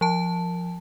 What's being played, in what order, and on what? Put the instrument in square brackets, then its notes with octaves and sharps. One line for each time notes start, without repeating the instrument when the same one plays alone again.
[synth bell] F3 A5